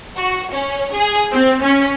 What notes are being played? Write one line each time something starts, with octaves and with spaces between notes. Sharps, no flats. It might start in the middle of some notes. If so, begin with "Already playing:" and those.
F#4
C#4
G#4
C4
C#4